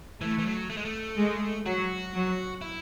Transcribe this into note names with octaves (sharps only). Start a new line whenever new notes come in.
E3 A3
E3
F#3
A3
G#3
A3
G#3
F#3 F#4
F#3
E4